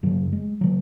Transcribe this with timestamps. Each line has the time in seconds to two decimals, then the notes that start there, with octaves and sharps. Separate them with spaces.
0.03 F#2 C#3 F#3
0.33 G#3
0.61 C#3 F#3